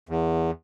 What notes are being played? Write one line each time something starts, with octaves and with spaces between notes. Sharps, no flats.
E2